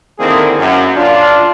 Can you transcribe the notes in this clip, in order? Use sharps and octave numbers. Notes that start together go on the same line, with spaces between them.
D3 D#3 A#3 C4 E4 G#4
F#2
D4 F4